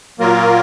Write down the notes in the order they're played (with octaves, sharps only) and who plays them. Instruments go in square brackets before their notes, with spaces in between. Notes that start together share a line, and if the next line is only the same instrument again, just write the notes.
[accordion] A#2 F#3 A#3 F4 A#4